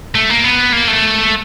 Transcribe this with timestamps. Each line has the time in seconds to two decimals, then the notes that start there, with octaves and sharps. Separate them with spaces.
0.15 A3
0.30 A#3
0.44 B3
0.72 A#3
0.88 A3